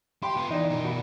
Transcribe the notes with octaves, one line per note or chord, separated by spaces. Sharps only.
G4 G5 B5 C6
B3 F4
E3 D#4 D5
B2 A#4
F#4 B5